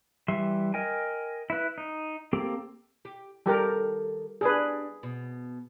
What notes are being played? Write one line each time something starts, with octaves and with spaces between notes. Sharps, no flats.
E3 G3 E5 C6
A#4 D#5 G5 G#5
E4 B4
D#4
A#3 C4 G4 A4
G4
D#3 G3 G4 A4 A#4
G3 D4 G#4 B4
B2